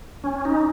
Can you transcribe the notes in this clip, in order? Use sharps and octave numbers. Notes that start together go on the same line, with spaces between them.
C#4
D#4